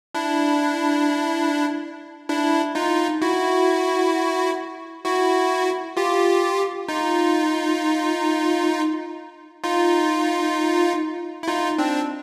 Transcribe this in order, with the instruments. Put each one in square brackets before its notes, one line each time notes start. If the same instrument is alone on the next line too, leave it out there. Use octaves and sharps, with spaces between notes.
[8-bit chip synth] D4 E4
D4 E4
D#4 F4
E4 F#4
E4 F#4
F4 G4
D#4 F4
D#4 F4
E4
D#4 F4
C4 D4